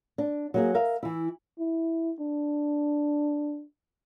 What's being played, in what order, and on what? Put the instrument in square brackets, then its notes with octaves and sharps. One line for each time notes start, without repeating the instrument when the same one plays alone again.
[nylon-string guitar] D4
F#3 A#3 G#4
A#4 E5 F5
E3 E4
[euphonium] E4
D4